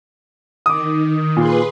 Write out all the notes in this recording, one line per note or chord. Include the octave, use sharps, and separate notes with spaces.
D#3 D6 D#6
A#2 G#4 B4 C6